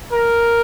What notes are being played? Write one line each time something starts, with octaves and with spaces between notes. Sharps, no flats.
A#4